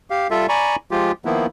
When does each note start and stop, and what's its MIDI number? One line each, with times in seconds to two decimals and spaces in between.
0.10 0.27 67
0.10 0.27 77
0.31 0.46 55
0.31 0.46 65
0.31 0.46 69
0.31 0.46 76
0.49 0.76 74
0.49 0.76 80
0.49 0.76 82
0.49 0.76 83
0.49 0.76 85
0.91 1.12 53
0.91 1.12 56
0.91 1.12 65
0.91 1.12 67
1.25 1.47 51
1.25 1.47 53
1.25 1.47 58
1.25 1.47 59
1.25 1.47 64